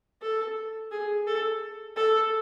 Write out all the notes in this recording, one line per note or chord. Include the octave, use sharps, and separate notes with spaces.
A4
G#4
A4
A4